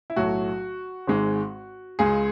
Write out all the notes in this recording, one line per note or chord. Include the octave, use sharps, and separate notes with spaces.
E4
B1 A2 F#3 A3 F#4
G#1 G#2 G#3
C#2 C#3 G#3 G#4